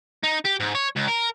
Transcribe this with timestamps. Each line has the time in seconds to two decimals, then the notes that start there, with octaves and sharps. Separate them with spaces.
0.24 D#4
0.45 G4
0.60 G#2
0.75 C#5
0.96 C#2
1.08 A#4